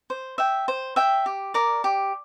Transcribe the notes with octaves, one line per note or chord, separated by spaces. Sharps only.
C5
E5 G5
C5
E5 G5
G4
A#4 D5
G4